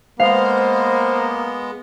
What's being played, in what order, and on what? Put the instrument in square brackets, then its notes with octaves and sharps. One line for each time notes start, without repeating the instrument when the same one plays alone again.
[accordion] G#3 B3 [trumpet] A#3 [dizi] C5 [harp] F5